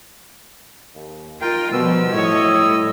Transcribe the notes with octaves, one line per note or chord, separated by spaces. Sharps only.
D#2
D#4 F4 A#4 G5
B2 D#3 F3 G3 E6
A2 C#5 D#5
G3